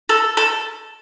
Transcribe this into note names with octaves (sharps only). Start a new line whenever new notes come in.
A4
A4